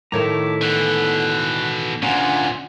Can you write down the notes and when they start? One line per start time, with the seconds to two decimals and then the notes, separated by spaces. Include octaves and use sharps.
0.12 A2 D#3 F3 A3 E4 C#5 A#5 D6
0.62 B2 D3 E3 F#6
2.03 D2 A#2 C#4 D4 F4 F#5 G#5 A#5